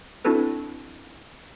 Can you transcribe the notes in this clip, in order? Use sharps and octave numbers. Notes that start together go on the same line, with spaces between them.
C4 D4 E4 F#4 A4 B4